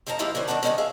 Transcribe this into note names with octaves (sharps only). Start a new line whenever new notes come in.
F2 G#2 F3 A5 A#5
F3 G#3 A#3 E4 F4 G4
D3 G3 C#4 C5
D#2 D#3 D4 F#5 A5
D3 D#3 G3 G#3 B3 C#4
G#4 E5 F5